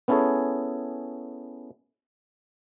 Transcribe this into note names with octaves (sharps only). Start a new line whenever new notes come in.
B3 C#4 E4 G#4 A4 C#5